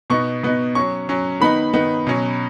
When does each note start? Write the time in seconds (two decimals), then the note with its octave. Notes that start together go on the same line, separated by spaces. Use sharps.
0.10 B2 B3 D#4 C#6
0.43 B2 B3 D#4
0.75 F#3 C#4 C#6
1.09 F#3 C#4
1.41 D#3 B3 D#4 B5
1.73 D#3 B3 D#4
2.07 B2 F#3 C#4